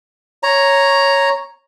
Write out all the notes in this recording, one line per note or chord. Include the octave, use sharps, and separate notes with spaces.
C#5 A#5